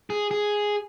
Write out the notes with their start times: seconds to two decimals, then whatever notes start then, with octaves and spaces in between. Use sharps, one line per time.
0.10 G#4
0.31 G#4